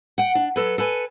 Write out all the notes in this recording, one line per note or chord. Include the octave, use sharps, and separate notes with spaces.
F#5 G5
D4
F#3 A4 B4
A4 B4 G#5